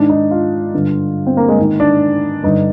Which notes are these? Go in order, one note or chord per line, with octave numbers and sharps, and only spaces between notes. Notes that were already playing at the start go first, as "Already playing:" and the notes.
Already playing: G#2 D#3 D4
D#4
F4
G2 D3
C4
A#3
G#3
G#2 D#3
D4
G2 D3 D#4